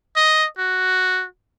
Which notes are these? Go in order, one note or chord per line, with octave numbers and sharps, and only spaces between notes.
D#5
F#4